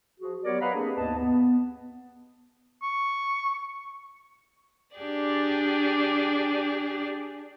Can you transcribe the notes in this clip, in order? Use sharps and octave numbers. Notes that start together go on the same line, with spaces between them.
F3 F#4 G#4
F#3 B3 G4 A#4 C#5 D5
B4 D#5 F5 F#5 A#5 B5
A#3 C4 D4 G4 G#4
D#2 G#2 B3 B4 D#5 A5
B3
C#6
D4 G4 G#4 D5